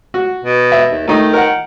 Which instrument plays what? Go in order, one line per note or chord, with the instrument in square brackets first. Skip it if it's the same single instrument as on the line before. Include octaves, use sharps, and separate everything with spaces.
[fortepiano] F#4
[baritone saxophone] B2
[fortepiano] E5
[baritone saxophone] D#2
[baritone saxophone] D#3 [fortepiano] A3 D#4
[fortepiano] A#4 F#5